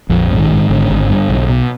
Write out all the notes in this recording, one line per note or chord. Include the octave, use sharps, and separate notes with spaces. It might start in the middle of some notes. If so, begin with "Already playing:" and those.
A#1 F2 F3
G#2
D#3
G#2
G#1 D3
G#1
G2
B1
B2